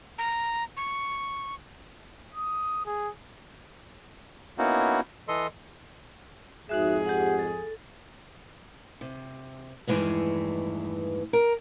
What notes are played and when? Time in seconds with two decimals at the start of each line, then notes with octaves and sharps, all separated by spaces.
0.18 A#5
0.77 C#6
2.35 D#6
2.86 G#4
4.58 A#3 B3 C#4 D#4 E4 F#4
5.28 E3 A4 D#5 C6
6.69 F2 G#2 D#4 F#4 G#4 E5
7.06 G4 F#5
7.39 A4
9.01 C3
9.87 E2 G2 D#3 E3 G#3 A3
11.33 A#4